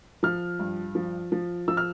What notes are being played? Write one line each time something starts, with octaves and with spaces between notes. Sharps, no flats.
F3 F6
G2
F3
F3
F3 E6
F6